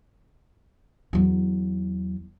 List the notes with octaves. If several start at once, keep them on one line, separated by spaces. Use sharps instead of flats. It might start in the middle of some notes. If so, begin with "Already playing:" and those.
E2 F#3